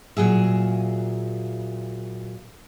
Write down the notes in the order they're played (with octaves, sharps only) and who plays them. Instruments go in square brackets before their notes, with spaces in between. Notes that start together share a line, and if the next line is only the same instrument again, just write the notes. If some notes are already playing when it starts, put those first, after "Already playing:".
[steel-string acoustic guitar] A#2 F#3 G#4 E5